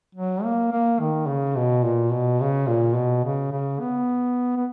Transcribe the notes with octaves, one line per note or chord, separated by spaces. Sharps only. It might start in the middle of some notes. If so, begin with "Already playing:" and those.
F#3
A#3
A#3
D#3
C#3
B2
A#2
B2
C#3
A#2
B2
C#3
C#3
B3
B3